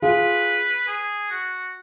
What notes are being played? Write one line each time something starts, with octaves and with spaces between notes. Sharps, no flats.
F4 G#4 B4
G#4
F#4